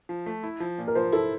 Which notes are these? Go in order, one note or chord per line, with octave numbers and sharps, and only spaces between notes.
F3
A3
E4
F3
A#2
A#4
F3 C5
E4 A4